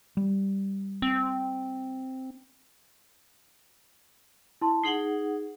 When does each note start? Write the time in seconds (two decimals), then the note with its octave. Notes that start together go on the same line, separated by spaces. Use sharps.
0.17 G3
1.02 C4
4.62 E4 A5 C6
4.84 D#4 G#4 F#5 C7 F#7 G7